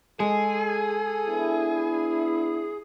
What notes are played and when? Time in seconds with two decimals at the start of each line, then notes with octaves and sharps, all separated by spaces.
0.20 G#3 G#4 A4
1.28 B3 D4 E4